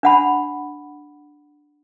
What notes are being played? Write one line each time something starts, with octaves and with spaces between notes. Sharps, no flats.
D4 F#5 B5